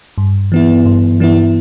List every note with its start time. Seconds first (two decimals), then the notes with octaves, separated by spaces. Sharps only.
0.18 G2
0.52 E3 B3 E4
0.86 G2
1.20 E3 B3 E4